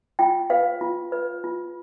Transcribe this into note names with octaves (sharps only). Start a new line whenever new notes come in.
F4 G5
B4 F5
F4
B4
F4